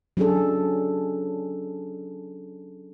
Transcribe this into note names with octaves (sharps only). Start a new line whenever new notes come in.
F#3 C#4 D4 G#4 A4